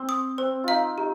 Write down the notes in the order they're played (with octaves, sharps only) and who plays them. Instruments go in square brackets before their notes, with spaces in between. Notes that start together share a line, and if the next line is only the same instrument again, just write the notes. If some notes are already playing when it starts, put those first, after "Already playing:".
Already playing: [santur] C4
[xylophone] D#6
[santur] C4 [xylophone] C5
[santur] D#4 F4 [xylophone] F5
[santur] D#4 [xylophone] G4